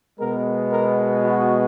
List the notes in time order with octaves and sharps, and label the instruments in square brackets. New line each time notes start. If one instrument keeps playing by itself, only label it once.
[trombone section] B2 G#3 B3 A#4
A#4
F#4